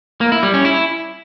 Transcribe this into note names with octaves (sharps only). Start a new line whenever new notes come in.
A#3
E4
G3
C#4
E4